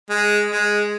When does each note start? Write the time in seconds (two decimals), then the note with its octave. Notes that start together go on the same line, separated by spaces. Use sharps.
0.10 G#3
0.51 G#3